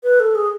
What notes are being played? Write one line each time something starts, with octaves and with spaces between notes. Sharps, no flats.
B4
A4
G#4